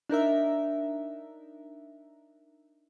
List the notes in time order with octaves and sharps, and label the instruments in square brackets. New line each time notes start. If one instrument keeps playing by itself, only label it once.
[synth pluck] D4 D#4 A#4 E5